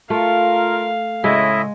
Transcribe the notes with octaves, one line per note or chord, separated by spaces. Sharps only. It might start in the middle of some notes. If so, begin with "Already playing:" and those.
A3 F4 A#4 F5
A2 C#3 G#3 E4 D#5 E5